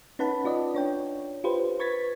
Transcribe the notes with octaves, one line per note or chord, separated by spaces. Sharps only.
C#4 D#4 B4 F#5 A5 B5
C#4 F4 D5 D#5
D4 C#5 G5
F4 G4 B4 C5
B4 C#6 G#6 A6 B6